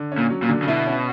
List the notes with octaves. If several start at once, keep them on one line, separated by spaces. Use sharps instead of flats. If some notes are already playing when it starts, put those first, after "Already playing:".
Already playing: D3
C#4
A#2
F#3
A#2
D3
C#3
B2 E4
C#4